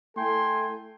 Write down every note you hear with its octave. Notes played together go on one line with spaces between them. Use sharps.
A3 E4 A4 G5 G#5 C6